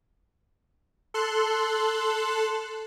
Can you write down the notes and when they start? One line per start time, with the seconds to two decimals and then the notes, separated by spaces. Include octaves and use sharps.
1.14 A4 C6 F#6